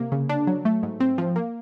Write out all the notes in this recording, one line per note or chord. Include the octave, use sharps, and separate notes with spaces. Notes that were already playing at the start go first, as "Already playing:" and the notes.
Already playing: C3 A#3
C#3
D4
F#3
A3
G#2
C4
F3
A#3